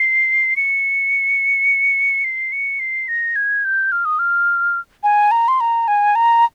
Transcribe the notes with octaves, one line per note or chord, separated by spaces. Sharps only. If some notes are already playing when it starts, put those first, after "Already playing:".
Already playing: C7
C#7
C7
C#7
C7
A#6
G#6
G6
F6
D#6
F6
G#5
A#5
C6
A#5
G#5
A#5